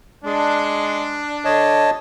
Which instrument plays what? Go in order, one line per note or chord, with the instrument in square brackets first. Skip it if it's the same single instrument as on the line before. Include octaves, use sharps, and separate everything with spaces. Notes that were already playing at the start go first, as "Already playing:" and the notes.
[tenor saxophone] G#3 [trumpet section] D4
[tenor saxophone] D3 [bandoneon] C#5 D#5 A5